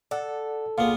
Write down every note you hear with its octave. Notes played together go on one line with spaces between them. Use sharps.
A4 D5 F#5
C2 A#2 B3 F4 G#4